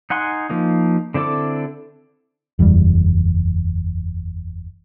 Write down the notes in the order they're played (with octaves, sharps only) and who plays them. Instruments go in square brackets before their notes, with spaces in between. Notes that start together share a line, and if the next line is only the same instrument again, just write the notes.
[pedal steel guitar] D#4 F#5 G#5 C6
F3 A#3 D#4
D3 C4 E4 A4 D6
[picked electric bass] F#1 E2 G2 G3